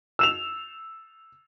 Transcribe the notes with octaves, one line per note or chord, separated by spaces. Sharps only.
E6 E7 F7